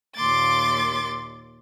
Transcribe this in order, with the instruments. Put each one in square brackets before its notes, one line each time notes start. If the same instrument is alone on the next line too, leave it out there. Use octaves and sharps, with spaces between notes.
[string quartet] D#2 A#2 C6 D6 A6